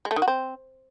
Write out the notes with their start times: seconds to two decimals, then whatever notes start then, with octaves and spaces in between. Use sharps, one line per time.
0.05 G#3
0.11 A3
0.16 D#3
0.22 F#4
0.28 C4